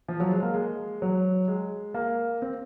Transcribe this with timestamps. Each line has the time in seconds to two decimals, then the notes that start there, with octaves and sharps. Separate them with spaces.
0.08 F3
0.20 F#3
0.32 G#3
0.43 A#3
0.54 G#3
1.02 F#3
1.48 G#3
1.94 A#3
2.42 C4